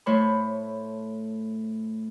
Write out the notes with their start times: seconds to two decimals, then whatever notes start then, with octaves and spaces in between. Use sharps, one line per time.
0.06 A2 A3 C5 C#5 B5